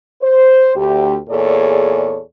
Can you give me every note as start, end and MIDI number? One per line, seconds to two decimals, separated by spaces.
0.22 0.75 72
0.76 1.16 38
0.76 1.16 67
1.29 2.20 40
1.29 2.20 46
1.29 2.20 68
1.29 2.20 69
1.29 2.20 73
1.29 2.20 74